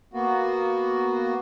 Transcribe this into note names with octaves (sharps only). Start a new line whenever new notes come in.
A#3 B3 F#4